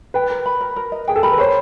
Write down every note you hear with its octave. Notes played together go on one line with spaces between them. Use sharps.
B4 G5
A#4
B5
A#4
A#4
D#5
G#4 G5
A4
A#4 B5
B4
C5 C#5